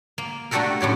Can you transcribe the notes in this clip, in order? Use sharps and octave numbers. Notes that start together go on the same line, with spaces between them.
A#3
A3 D4 F#4 G4 A4 A#4
F#2 A2 G4 C#5